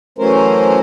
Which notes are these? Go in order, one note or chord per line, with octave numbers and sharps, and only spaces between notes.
E3 F#3 A3 C#4 A#4 C5